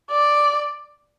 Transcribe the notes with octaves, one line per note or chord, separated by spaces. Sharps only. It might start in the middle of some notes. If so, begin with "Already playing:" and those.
D5